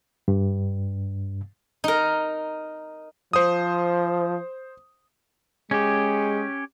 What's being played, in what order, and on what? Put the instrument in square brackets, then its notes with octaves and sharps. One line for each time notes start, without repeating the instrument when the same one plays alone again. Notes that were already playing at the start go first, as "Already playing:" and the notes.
[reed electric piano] G2
[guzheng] D#4 A#4
[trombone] F3 [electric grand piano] C5 D#6
[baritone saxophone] G#3 [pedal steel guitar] C#4 G4